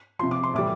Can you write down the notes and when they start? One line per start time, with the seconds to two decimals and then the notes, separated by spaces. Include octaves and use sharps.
0.19 C3 F3 C6
0.31 D6
0.44 C6
0.54 A2 E3 G3 D6